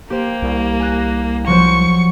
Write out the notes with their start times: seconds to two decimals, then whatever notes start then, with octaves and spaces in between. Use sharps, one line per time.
0.10 A#3 G4 C5
0.42 C2
0.80 G#5 F#6 A#6
1.47 F3 F#3 C5 C#6